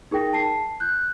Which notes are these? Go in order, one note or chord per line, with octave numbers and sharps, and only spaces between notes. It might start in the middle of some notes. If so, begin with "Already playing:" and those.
D#4 G#4 A#4 G5 A#6
A5 C7
F#6 G6